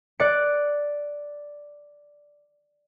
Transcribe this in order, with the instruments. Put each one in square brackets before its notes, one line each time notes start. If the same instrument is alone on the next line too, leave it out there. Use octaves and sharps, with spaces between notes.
[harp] D5 F#6 C#7